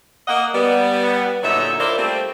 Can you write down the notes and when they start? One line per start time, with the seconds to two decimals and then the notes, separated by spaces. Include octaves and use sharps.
0.27 A#3 D#5 F#5
0.54 G3 B3
1.43 A#2 D3 F#3 D#4 E5
1.79 E4 F4 A#4 C5 D5 E5
1.97 G3 A3 A#3 C4